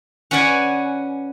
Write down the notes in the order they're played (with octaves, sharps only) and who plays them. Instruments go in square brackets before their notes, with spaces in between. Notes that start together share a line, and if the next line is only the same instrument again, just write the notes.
[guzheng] C#4 F#4 B4 D5 F#5 G#5